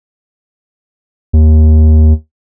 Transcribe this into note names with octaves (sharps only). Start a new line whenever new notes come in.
D#2